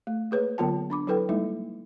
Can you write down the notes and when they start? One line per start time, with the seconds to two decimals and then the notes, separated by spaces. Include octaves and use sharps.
0.07 A3
0.31 A#3 G#4 B4 C#5
0.58 D3 F#3 B3 F4 G5 A5
0.90 D4 B5 D6
1.07 F#3 E4 A4 B4 G5
1.29 G3 G#3 A#3 D#4 E4